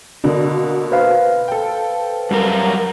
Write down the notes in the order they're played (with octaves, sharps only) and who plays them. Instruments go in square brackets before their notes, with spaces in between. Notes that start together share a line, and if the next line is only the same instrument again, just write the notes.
[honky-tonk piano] B2 D3 A#3 [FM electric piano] D4
[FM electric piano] B4 C5 F5
[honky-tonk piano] A4 G5
[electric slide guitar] F#2 G3 A#4